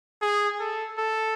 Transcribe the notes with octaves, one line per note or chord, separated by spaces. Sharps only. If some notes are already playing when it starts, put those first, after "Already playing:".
G#4
A4
A4